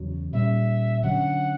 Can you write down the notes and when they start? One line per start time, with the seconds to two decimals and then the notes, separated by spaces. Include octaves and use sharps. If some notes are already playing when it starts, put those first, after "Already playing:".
Already playing: E2 C#3 F#3
0.33 A#2 G3 C#4 E5
1.03 D3 F#3 C#4 F#5